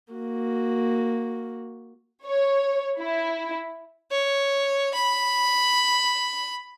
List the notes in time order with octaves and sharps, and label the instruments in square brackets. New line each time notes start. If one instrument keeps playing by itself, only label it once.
[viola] A#3 F#4
[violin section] C#5
E4
[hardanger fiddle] C#5
B5